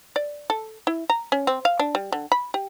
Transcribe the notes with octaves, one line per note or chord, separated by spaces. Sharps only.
D5
A4
E4
A#5
C#4
C4
F5
D4
G3
D3
B5
G4